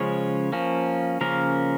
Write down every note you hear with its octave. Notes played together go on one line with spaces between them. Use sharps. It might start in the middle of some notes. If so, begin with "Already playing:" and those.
Already playing: C#3 F3 G#3 C#4 C#5
F3 A#3 C#4
C#3 F3 A#3 C#4 A#4